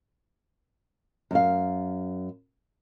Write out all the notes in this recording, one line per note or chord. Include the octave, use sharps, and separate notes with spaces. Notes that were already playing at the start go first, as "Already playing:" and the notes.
F#2 F5